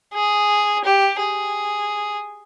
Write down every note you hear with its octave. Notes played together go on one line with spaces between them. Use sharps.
G#4
G4
G#4